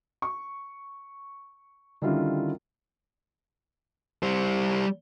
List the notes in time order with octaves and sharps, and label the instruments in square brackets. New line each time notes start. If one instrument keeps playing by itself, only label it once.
[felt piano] C#6
D3 D#3 G3 C#4 E4 F4
[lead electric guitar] G3 C5